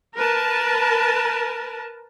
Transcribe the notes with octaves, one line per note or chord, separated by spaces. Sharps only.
A#4 B4 A5